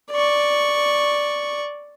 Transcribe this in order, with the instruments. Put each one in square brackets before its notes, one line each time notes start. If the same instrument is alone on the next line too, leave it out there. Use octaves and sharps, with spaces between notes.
[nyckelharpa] D5 C#6